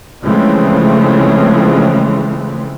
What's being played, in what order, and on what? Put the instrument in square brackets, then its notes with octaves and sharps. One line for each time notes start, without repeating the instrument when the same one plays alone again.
[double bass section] C#3 E3 F3 G#3 A3 C4